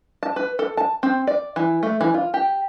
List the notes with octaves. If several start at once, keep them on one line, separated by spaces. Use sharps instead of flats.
A5
B4
A4
A5
C4
D5
E3
A3
E3
F4
G4